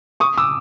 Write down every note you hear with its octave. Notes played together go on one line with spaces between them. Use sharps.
C#6 D#6
D6 E6